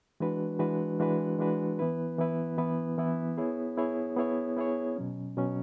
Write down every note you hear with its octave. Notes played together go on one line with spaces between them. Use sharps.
E3 G#3 D4 F#4 B4
E3 G#3 D4 F#4 B4
E3 G#3 D4 F#4 B4
E3 G#3 D4 F#4 B4
E3 B3 E4 B4
E3 B3 E4 B4
E3 B3 E4 B4
E3 B3 E4 B4
B3 E4 G#4 C#5
B3 E4 G#4 C#5
B3 E4 G#4 C#5
B3 E4 G#4 C#5
B2 F#3 C#4
B2 F#3 C#4